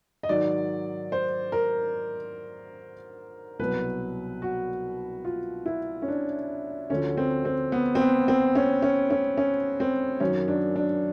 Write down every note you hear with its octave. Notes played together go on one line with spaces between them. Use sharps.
D#5
G#2 D#3 F#3 D5
C5
A#4
C2 B2 F#3 B4
F#4
F4
E4
C#4
D4
D2 D3 F3 C#4
C4
C4
B3
C4
B3
C4
C#4
C#4
C#4
C#4
C4
F#2 D#3 F#3 C#4
D4
D4